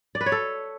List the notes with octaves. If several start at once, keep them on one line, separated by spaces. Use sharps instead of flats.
D5
B4
C#5
A4